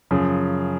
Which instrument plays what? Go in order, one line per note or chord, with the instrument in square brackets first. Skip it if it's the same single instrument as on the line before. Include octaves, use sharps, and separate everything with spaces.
[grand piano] F#2 C#3 F3